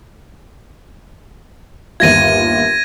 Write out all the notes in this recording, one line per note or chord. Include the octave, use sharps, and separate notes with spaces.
G1 D#2 F4 G#6 A#6 D#7